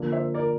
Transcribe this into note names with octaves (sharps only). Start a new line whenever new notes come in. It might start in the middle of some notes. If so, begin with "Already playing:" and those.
Already playing: D3 F3 A#3
C5 E5
A#4 D5